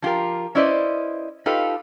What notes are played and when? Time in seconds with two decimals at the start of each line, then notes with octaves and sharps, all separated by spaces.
0.02 F3 F4 G4 A#4
0.55 C#4 E4 B4 C5 D5 D#5
1.46 D#4 F4 G4 A4 B4 F5